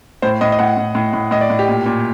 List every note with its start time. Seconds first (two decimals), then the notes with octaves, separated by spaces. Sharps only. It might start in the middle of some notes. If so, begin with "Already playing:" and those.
0.22 A2 C5
0.41 A2 D#5
0.52 D#5
0.59 A2 F#5
0.77 A2
0.95 A2
1.13 A2
1.31 A2 D#5
1.41 D5
1.50 A2
1.59 G4
1.68 A#2
1.86 A#2